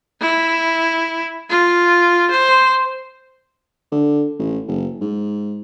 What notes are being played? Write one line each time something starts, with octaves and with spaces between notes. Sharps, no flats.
E4
F4
C5
D3
A1
F#1
G#2